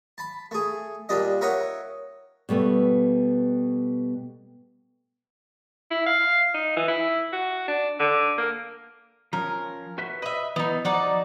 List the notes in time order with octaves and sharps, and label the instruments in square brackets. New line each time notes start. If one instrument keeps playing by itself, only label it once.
[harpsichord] A5 B5
A3 G#4
A#2 G3 D4 D#5
D#4 A#4 C#5 E5 F#5 A#5
[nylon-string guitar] B2 G3 A3 B3
[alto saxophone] E4
F5
D#4
E3
E4
F#4
D4
D3
A#3
[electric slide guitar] F3 C#4 [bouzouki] A#4
[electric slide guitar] F#4 B4 E5
[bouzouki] B4 E5 [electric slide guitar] D#5
[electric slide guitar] E3 E4 [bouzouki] B3 D#4
[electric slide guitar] F3 [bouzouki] D#4 F#4 D5